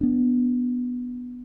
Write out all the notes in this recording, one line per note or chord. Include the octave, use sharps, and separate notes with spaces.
B3 D4